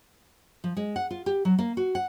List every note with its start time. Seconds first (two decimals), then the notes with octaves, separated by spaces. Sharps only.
0.64 F3
0.77 G#3
0.96 F#5
1.11 F4
1.26 G4
1.45 F#3
1.58 A#3
1.77 F#4
1.95 F#5